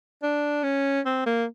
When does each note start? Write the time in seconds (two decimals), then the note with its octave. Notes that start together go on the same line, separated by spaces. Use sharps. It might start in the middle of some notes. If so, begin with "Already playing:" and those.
0.23 D4
0.63 C#4
1.06 C4
1.26 A#3